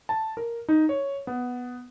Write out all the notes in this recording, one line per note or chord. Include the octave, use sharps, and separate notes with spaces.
A5
A#4
D#4
C#5
B3